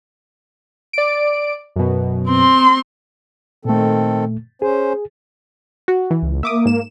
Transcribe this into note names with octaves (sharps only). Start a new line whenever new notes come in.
D5 D7
F#2 B2
C4 C6
A#2 D#3 A3 C4 A4
C#4 G#4 C5
F#4
E3
C#2
A#3 E5 D6 D#6
G#2 E7